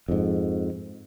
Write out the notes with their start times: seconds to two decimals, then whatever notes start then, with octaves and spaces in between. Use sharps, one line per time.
0.08 F2 G#2